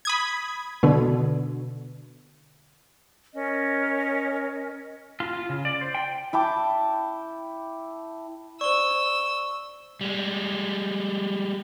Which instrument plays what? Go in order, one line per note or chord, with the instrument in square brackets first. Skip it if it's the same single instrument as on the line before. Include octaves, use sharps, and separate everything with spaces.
[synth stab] B5 D#6 G#6
B2 D3
[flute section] C#4 A#4 D#5
[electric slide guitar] F4
F4
C#3
D5
C5
G5
[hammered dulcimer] E4 G5 A5 D6
[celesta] C5 D5 [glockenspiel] C#6 G7 [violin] E6
[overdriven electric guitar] G3 G#3